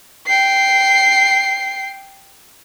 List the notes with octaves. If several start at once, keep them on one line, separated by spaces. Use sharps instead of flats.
G5 C7